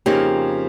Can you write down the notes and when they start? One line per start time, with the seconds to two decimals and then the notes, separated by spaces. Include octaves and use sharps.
0.06 F2 C#3 F3 A#3 D#4 G4